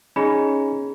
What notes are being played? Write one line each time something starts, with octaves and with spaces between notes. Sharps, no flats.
C#4 D#4 G#4 B5